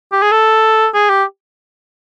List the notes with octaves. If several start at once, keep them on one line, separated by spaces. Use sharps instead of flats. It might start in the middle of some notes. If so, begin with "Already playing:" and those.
G4
G#4
A4
G#4
G4